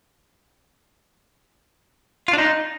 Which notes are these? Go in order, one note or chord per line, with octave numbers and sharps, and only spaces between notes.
F4
D4
D#4